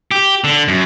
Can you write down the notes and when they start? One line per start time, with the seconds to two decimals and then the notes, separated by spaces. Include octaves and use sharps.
0.11 G4
0.44 D3
0.68 F#2